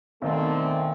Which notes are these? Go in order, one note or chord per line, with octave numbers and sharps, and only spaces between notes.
B1 D3 D#3 A3 C4